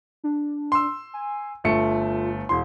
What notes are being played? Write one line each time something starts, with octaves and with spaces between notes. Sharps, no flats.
D4
C6 E6
G#5
G1 A3 F4 C#7
E1 E4 C6